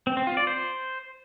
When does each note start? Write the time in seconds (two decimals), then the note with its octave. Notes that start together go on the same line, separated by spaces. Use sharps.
0.07 C4
0.17 C4
0.27 F4
0.37 D5
0.47 C5